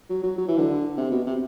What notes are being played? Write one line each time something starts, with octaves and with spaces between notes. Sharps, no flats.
F#3
F#3
F#3
E3
D3
C3
B2
C3